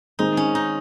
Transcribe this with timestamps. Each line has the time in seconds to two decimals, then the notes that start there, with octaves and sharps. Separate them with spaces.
0.19 D#3 G#3 C4 D#4
0.37 C#4
0.55 D#4